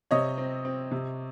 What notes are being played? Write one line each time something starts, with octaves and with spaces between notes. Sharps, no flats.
C3 C#5 D#5
C4
C4
C3